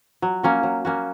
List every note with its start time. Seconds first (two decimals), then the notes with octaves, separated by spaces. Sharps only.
0.22 F#3
0.43 A#3 C#4 F#4
0.63 F#3
0.85 A#3 C#4 F#4